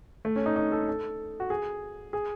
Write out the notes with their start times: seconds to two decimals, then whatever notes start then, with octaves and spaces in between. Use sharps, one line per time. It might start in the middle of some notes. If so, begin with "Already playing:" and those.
0.25 A3
0.36 C#4
0.46 D#4
0.56 D#4
0.72 A4
0.88 A4
1.40 F#4
1.50 G#4
2.13 G#4